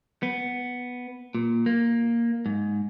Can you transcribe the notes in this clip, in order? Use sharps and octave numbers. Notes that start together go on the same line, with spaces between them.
B3
A#2
A#3
G#2